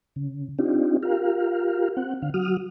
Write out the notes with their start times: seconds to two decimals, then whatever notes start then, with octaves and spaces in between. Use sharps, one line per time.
0.16 C#3
0.59 C4 D4 D#4 F4 G4
1.03 F4 G4 A#4 F5
1.97 C4 F#5
2.22 D3 F5
2.34 F#3 F#4 D#6 F6